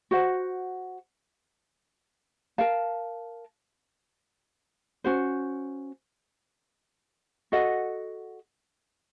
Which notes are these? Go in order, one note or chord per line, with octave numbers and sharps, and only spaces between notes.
F#4 C5 F#5
A#4 F5 A5
C#4 F#4 C5
F#4 A4 D#5 F#5